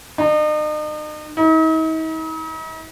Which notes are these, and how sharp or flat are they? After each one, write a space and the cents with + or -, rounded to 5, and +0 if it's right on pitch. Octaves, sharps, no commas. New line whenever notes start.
D#4 -40
D#4 +45